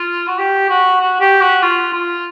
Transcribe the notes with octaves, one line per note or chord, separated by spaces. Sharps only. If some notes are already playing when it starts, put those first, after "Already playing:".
Already playing: F4
F#4
G4
F#4
F#4
G4
F#4
F4
F4